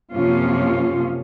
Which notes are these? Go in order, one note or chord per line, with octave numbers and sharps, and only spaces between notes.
F#2 C3 F3 A#3 C#4 F4